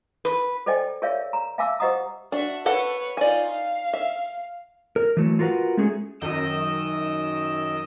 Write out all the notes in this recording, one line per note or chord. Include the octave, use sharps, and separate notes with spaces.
B4
A4 C5 D5 D#5 G5 G#5
G#4 A#4 C#5 D5 E5 F5
A#5
E5 F5 G#5 A5 D6 E6
G4 C5 D#5 F#5 A#5 D#6
D4 F#4 E5
A4 B4 C#5 F#5
D#4 F4 D5 G#5
F5
E5
A#4
E3 F#3 A3
F4 F#4 A#4 B4 F#5
G#3 A3 C#4 G#4
F#2 D#3 D#5 E6 D7 E7